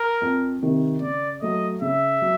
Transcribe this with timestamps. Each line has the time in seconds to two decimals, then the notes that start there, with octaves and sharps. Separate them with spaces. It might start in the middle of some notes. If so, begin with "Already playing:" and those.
Already playing: A#4
0.22 F2
0.62 C3 D#3
1.02 C#3 D5
1.42 F#3 A3 D#5
1.81 C#3 E5
2.22 F#3